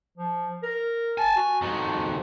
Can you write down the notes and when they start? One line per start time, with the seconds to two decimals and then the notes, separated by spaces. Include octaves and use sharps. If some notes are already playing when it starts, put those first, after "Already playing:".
0.18 F3
0.63 A#4
1.18 G#5 A5
1.36 F#4
1.62 F2 D#3